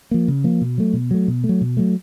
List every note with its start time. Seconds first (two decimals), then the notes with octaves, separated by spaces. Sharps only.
0.11 F3 A#3
0.28 C#3
0.44 F3 A#3
0.61 B2
0.78 F#3 A3
0.94 B2
1.11 F#3 A3
1.28 B2
1.44 A3
1.49 F#3
1.61 B2
1.77 F#3 A3